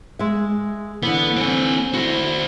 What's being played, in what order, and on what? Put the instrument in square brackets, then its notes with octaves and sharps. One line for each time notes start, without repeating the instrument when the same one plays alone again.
[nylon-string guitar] G#3 E5
[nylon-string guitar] D3 E3 [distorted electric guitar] B3
[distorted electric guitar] C4 G#5
[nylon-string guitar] E4 [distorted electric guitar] F#4 C5